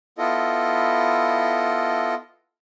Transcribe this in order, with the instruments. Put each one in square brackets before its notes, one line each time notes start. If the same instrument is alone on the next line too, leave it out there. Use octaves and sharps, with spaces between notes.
[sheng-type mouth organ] B3 E4 F4 A4 D#5